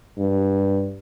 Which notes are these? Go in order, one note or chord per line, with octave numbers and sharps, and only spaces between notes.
G2